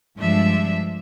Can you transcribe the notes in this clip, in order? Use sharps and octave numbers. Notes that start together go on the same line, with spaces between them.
G2 F3 G#3 D4 E5